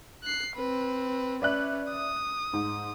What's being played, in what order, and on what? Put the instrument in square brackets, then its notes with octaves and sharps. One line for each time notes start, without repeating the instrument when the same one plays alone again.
[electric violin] F#6 C7
C4 B4
[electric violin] C#4 B4 [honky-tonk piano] D5 E5 F#6
[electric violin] D#6
[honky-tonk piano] G#2